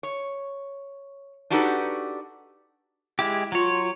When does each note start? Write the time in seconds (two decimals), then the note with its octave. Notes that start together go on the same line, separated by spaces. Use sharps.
0.03 C#5
1.50 D4 D#4 F#4 G4 A4 B4
3.19 G#3 E4 G4
3.52 F#3 F4 C#5